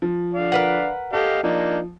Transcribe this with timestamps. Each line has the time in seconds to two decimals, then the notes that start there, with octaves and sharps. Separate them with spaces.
0.02 F3
0.34 D3 D5 F5
0.52 A#4 B4 F#5
1.13 G4 A4 D#5 F5
1.43 F3 A#3 D4 D#4